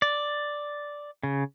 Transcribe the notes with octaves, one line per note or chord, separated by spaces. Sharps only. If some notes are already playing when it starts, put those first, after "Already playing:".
D5
C#3